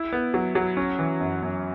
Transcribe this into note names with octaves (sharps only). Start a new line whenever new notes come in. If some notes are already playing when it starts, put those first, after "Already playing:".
Already playing: E4
B3
F#3
F#3
C#4
E3
F#2
F#2